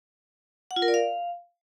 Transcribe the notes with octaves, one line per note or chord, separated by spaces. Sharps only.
F#5
F4
A#4
D5
F5